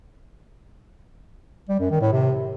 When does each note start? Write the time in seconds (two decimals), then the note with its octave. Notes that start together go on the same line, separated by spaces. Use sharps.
1.69 G3
1.80 F#2
1.91 D#3
2.01 A2
2.12 C3